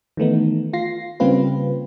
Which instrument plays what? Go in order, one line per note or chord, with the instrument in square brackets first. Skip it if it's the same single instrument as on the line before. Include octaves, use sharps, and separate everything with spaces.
[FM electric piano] D#3 E3 A3 B3 D#4
F4 A#6 C7
C#3 G3 A#3 C4 F4 B4